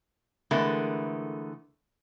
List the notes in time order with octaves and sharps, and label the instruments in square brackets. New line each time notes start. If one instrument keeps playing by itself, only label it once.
[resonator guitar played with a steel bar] D3 E3 G#3 A3 B3 A#4